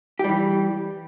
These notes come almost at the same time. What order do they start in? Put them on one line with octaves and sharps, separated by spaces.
G4 G3 E3